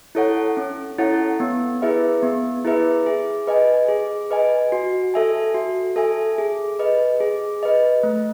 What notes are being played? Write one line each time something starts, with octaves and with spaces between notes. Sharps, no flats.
E4 A4 C#5 F#5
C#4
E4 A4 C#5 F#5
B3
E4 G#4 B4 E5
B3
E4 G#4 B4 E5
G#4
B4 D#5 G#5
G#4
B4 D#5 G#5
F#4
A4 E5 G#5
F#4
A4 E5 G#5
G#4
B4 D#5
G#4
B4 D#5
A3